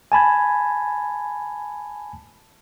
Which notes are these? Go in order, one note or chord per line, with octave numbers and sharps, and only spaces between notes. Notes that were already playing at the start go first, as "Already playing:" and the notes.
G#5 A5 B5 G#6